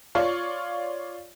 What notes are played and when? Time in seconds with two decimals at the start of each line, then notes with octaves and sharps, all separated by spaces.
0.15 F4 C#5 D5 F5 C#6